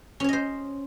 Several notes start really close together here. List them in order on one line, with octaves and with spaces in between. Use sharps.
C#4 C#5 D#5 C5